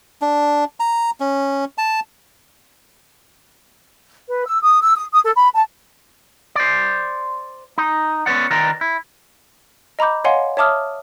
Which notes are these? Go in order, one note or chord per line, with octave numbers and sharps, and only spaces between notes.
D4
A#5
C#4
A5
B4
E6
D#6
E6
D#6
D#6
A4
B5
A5
C5 D5
D#4
B3 C#4 B4 D5 F#5
D#3 A#4 B4 D5 G5 A#5
E4
D#5 A#5 B5 D6 G6
C#5 D#5 F5 F#5 G#5 C6
C#5 E5 A5 D6 D#6 F6